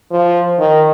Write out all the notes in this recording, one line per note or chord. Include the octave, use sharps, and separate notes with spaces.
F3
D#3